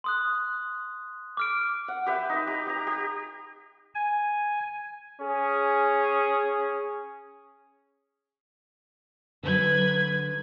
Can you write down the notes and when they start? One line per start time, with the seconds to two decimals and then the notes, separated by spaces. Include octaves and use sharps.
0.04 C6 D#6 F#6
1.37 D6 F6 D7
1.88 F#5
2.06 G4 B4 E5
2.29 D#4 B4
2.47 G4
2.67 G4 A#5
2.87 G4
3.95 G#5
5.20 C#4 G#4
9.43 D3 F#3 B4 G#6